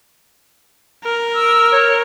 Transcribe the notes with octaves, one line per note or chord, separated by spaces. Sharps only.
A#4
E6
C#5